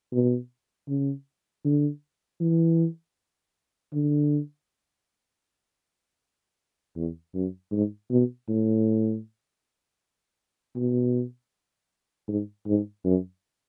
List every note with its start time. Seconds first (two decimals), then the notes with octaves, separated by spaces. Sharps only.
0.13 B2
0.89 C#3
1.65 D3
2.41 E3
3.93 D3
6.96 E2
7.34 F#2
7.72 G#2
8.11 B2
8.49 A2
10.76 B2
12.28 G#2
12.67 G#2
13.05 F#2